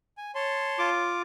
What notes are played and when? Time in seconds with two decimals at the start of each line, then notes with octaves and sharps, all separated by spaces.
0.18 G#5
0.35 C#5 A5 C6
0.79 F4 D6